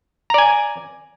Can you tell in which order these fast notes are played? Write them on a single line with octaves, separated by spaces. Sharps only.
A#5 D5 G#5